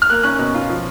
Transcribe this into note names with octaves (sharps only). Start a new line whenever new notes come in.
F6
A#3 F#6
C#4 F#6
B2
F4
F3